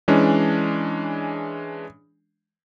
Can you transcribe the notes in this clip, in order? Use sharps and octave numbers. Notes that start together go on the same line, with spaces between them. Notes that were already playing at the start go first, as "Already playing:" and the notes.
E3 G#3 C#4 D4